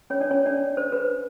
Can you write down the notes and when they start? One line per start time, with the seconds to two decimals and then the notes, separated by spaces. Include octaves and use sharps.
0.10 C#4 C#5
0.20 D4 D5
0.31 C#4 C#5
0.46 D4 D5
0.77 C5
0.92 B4